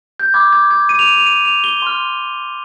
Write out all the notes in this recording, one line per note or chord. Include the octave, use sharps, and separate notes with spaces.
G6
B5 D6 F6 G#6
G#6
G#6
D#7
F7
D#7
F7
D#7
F7
G7
C6 F6